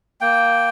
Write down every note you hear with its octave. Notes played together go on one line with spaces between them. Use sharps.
A#3 G5